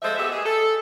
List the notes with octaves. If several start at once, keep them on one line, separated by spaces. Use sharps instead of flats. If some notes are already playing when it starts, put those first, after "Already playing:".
F3 G#3 A3 A4 C5 E5
B3 G4 G#4 E5
G#4
A4